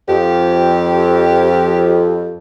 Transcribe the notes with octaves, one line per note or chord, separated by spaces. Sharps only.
F2 G4